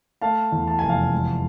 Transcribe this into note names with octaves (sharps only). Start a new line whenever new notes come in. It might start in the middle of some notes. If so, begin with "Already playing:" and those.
A3 F5 A5
E2
A5
F1 G#5
F5 A5
G#3